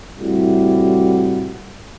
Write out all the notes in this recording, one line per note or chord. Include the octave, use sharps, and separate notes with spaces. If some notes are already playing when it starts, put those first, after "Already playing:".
A2 C3 G3 E4 F#4